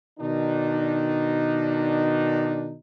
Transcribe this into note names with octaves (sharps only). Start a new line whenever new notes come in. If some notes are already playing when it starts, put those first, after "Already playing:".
B2 D#3 D4 D#4